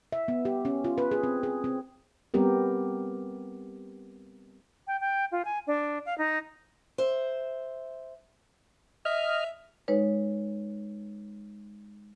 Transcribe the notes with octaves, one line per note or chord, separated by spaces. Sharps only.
E5
B3
G4
C#4
F4
B4
G#4
C4
G#4
C4
G3 B3 C4 G4 A#4
G5
G5
F4
G#5
D4
F5
D#4
C5 E5
D#5 E5 F6
G#3 D#4 B4 C#5